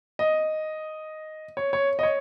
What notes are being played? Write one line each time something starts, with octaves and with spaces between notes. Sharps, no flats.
D#5
C#5
C#5
D#5
C#5